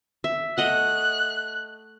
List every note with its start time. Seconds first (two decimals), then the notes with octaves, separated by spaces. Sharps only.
0.24 E5
0.58 A3 D#5 F#5 F#6